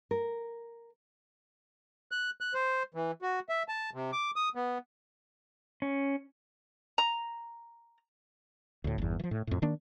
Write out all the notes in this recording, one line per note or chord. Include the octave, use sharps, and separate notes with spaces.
A#4
F#6
F#6
C5
E3
F#4
E5
A5
C3
D6
D#6
B3
C#4
A#5
D2 A2
G1 E2
E3 F3
A2
F2 A2
D#3 A#3 D4